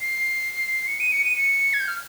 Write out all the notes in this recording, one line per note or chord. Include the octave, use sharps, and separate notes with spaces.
C7
C#7
D#7
C#7
D#7
C#7
G#6
G6
F6